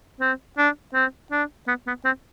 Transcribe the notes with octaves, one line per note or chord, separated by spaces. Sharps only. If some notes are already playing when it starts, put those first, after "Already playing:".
C4
D4
C4
D4
B3
B3
C4